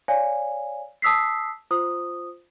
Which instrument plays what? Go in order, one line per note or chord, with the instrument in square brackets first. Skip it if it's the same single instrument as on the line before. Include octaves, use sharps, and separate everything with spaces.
[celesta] C#5 D5 F5 G#5
A5 D#6 E6 B6 C7
F4 C5 D#6